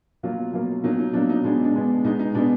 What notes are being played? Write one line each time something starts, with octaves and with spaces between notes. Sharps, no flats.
B2 F#3 A#3 F4
B2 F#3 A#3
B2 F#3 A#3 D#4
D#4
B2 F#3 A#3 D4
D#4
B2 G#3 B3 D4
D4
B2 G#3 B3
B2 G#3 B3 D#4
D#4
B2 G#3 B3 D4